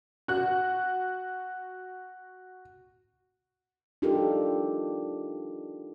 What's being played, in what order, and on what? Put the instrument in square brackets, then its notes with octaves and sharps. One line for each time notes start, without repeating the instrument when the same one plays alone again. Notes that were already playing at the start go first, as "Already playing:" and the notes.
[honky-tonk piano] F#4 F#6
[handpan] D4 D#4 F4 G4 A4 A#4